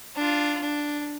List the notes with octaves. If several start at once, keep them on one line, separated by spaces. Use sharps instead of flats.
D4 F4
D4